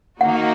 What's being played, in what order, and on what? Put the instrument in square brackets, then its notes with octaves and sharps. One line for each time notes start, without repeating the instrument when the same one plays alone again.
[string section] D#3 A#3 D#4 F#4 [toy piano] F#5